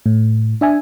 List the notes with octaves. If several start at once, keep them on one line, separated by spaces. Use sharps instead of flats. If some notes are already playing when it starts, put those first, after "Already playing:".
A2
D4 E5 G#5